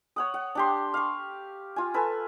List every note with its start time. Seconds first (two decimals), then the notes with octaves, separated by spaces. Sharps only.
0.16 C#5 F#5 D#6
0.34 F#5
0.55 D4 G4 C6
0.94 F5 C#6
1.76 F4 G#5
1.94 A4 B4 G#5